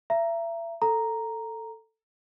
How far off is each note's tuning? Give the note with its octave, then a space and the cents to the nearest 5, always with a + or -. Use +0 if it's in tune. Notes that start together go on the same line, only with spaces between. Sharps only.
E5 +35 A#5 +0
A4 +10 A#5 +0